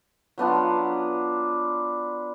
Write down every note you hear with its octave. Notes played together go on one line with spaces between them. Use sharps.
F#3 B3 D4 F4